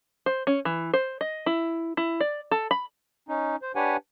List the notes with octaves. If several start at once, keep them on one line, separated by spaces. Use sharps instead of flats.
C5
C#4
E3
C5
D#5
E4
E4
D5
A4
B5
C#4 D#4
C5
D4 G4 B4 C#5 F#5 G#5